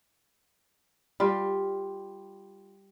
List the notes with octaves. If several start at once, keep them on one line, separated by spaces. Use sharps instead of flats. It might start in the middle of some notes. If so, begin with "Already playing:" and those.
G3 F4